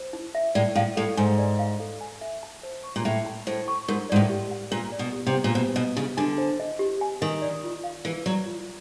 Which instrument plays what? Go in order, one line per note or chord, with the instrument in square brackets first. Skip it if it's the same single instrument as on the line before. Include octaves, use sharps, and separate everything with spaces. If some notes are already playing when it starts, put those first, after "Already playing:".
Already playing: [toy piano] C5
D#4
E5
[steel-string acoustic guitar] A2 [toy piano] D5
[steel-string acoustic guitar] A2 [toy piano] F5
[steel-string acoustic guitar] A2 [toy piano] A4
[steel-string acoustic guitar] G#2 [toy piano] G#5
[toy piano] D5
F5
A4
G#5
E5
A5
C5
C#6
[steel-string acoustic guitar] A#2
[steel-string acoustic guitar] A2 [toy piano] E5
[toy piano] A5
[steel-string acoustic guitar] A2 [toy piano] C5
[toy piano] C#6
[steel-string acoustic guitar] G#2 [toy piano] A#4
[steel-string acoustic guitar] G#2 [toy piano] D5
[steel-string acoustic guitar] A2
[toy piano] G4
F#5
[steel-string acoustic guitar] A#2 [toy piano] A#4
[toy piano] D5
[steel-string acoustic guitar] B2
[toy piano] G4
[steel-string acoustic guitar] C3
[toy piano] F#5
[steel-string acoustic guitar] A#2
[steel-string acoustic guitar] B2 [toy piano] C5
[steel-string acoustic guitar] B2 [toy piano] D#5
[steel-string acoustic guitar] C#3 [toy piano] G4
[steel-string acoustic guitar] D3 [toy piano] G#5
[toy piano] C5
D#5
G4
G#5
[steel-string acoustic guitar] D#3 [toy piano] A#4
[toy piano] D5
F4
F5
[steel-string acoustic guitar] E3 [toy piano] A#4
[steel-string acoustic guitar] F#3 [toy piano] D5
[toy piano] F4